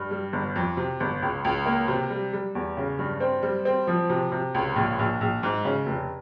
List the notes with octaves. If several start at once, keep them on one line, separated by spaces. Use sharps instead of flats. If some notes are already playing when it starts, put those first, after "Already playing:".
Already playing: G2
G3
G1
F2
C3
G1
C#2
C#2
A#3
C3
G3
G3
E2
C#3
G2
C4
G3
C4
F3
C3
C3
C#2
A#1
A#1
A#1
G#2
C#3
F1